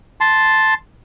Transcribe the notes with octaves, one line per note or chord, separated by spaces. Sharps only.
A5 C6